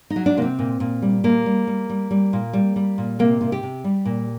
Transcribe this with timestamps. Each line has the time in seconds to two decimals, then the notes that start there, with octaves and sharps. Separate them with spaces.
0.10 D#4
0.16 F#3
0.26 D4
0.37 C3 A#3
0.42 C4
0.59 A#2
0.80 A#2
1.02 G3
1.24 A#2 A#3
1.46 G3
1.67 G3
1.90 G3
2.11 G3
2.33 A#2
2.53 G3
2.76 G3
2.98 A#2
3.19 C3 A#3
3.41 C3
3.52 G4
3.63 C3
3.84 G3
4.05 A#2